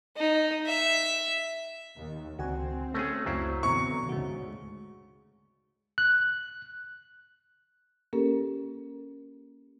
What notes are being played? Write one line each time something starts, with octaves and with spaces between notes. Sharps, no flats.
D#4
E5
D#2
C#2 D3 C4 F#4 G#5
A3 C#4 G#4 A#6
C#2 F#2 F#3 E4 C5 F5
B2 D3 E3 C4 A#5 C#6
D2 G#2 C#3 G#3 F#4
F#6
A#3 C#4 G4 A4 A#4